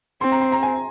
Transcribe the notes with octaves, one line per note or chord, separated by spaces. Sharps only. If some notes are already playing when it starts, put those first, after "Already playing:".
C4 C6
A#5
C6
A#5
G#5